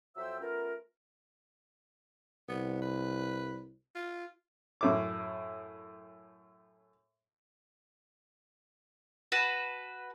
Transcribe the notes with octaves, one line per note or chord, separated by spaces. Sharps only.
F2 F#3 C5 E5 G5 E6
A3 B3 C#4 F4 A#4
C2 B3
B4
F4
F#2 A2 D6
F#4 B4 A5